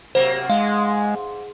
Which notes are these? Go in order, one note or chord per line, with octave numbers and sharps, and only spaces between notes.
C3 F#3 A#3 C5
G#2 G#3 F5